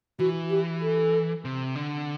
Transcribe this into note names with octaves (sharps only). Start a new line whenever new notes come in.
E3 F#4
G4
A4
C3
D3